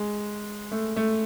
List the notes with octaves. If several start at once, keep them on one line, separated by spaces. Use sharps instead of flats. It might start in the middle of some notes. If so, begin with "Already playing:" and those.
Already playing: G#3
A3
A3